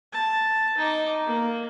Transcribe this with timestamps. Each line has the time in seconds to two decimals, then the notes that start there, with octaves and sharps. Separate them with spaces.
0.13 A5
0.78 D#4 D6
1.27 A#3